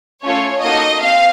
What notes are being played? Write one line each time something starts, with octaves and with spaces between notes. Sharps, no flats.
A3 C#4 F4 A4 C#5
A#3 D#4 F#4 A4 D#5
C4 F5